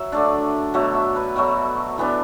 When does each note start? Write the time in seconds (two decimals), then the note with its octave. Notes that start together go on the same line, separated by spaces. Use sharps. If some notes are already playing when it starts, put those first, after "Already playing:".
Already playing: F#3 E5
0.12 D3 A3 D4 D5
0.74 B2 F#3 A3 E5
0.95 E5
1.16 B4
1.36 B2 F#3 A3 F#4
1.98 E3 B3 D4